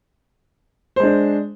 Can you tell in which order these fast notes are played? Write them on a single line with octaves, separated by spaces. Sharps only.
C5 G#3 D4